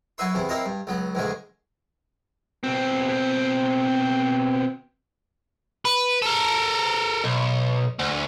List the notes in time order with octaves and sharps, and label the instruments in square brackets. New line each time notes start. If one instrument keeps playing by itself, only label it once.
[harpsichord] F#2 E4 F#4 B4 E5 C6
E2 C3 E3 B3
A#3 C4 D#4 E4 D#5 F5
G2
C#2 F#3 B3
A#1 E2 G#2 C#3 G#3 A3
[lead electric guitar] B2 C4
[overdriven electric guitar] B4
A4 A#4
B1
D2